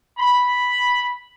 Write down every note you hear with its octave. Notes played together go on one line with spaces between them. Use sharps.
B5